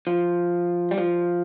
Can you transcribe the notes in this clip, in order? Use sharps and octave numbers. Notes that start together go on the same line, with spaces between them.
F3
G3
F3